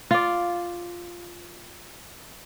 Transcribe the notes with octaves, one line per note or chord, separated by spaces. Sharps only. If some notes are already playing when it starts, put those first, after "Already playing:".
F4 D5